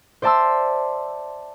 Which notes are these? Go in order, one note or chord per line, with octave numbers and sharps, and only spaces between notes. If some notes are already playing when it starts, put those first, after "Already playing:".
C5 D5 E5 A5 C6 E6